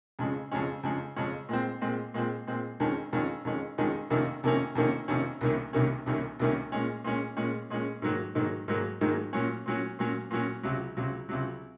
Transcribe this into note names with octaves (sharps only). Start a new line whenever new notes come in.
F2 C#3 G#3 C#4
F2 C#3 G#3 C#4
F2 C#3 G#3 C#4
F2 C#3 G#3 C#4
A#2 G#3 C4
A#2 G#3 C4
A#2 G#3 C4
A#2 G#3 C4
F2 D#3 G#3 C#4
F2 D#3 G#3 C#4
F2 D#3 G#3 C#4
F2 D#3 G#3 C#4
F2 C3 D#3 A#3 C#4
F2 C3 D#3 A#3 C#4
F2 C3 D#3 A#3 C#4
F2 C3 D#3 A#3 C#4
C2 C3 D#3 A#3 C#4
C2 C3 D#3 A#3 C#4
C2 C3 D#3 A#3 C#4
C2 C3 D#3 A#3 C#4
A#2 G#3 C#4
A#2 G#3 C#4
A#2 G#3 C#4
A#2 G#3 C#4
G#2 D#3 F#3 A#3
G#2 D#3 F#3 A#3
G#2 D#3 F#3 A#3
G#2 D#3 F#3 A#3
A#2 F#3 C#4
A#2 F#3 C#4
A#2 F#3 C#4
A#2 F#3 C#4
C#2 C3 F#3
C#2 C3 F#3
C#2 C3 F#3